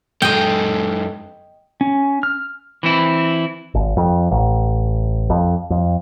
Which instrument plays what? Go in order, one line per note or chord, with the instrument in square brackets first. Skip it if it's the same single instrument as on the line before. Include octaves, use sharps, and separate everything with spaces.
[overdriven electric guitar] F#2 G#3 [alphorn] A4 [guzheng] D#5 G5
[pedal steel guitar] C#4
F6
[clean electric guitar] E3 C4 E4
[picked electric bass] G#1
F2
A1
F2
F2